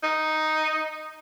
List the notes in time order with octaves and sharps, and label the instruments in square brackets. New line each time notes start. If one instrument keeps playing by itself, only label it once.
[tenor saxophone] D#4